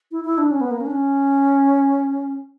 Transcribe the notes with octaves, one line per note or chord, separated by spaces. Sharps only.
E4
E4
D4
C#4
B3
A#3
C#4
D4
C#4